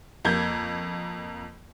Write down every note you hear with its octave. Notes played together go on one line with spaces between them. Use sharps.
F2 A#3 G6 G#6